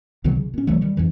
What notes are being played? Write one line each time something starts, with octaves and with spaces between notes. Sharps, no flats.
C2 B2 D#3 F#3
C#3
A#2 C#4
C2 E3 F#3 A3
D#3 G3
F2 G#2 E3